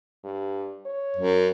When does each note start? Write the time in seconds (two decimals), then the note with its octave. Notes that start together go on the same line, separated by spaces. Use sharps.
0.24 G2
0.86 C#5
1.17 F#2